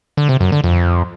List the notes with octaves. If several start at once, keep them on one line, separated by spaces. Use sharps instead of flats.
D3
C3
F#2
D3
F2